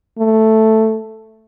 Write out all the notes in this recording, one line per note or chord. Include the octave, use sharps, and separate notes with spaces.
A3